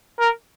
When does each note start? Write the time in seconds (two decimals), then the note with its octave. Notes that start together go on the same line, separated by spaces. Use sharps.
0.20 A#4